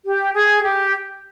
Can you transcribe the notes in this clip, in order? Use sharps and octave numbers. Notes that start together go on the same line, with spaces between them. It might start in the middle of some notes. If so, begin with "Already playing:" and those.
G4
G#4
G4